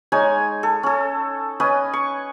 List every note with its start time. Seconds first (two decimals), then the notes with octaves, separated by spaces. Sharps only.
0.12 G#3 D#4 C#5 G#5
0.63 A4
0.83 C#4 A4
1.60 C#4 B4 D#5 G#5
1.93 C#6